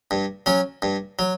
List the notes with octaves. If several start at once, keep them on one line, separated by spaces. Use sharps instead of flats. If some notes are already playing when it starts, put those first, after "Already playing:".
G2
F#3 C#4
G2
F#3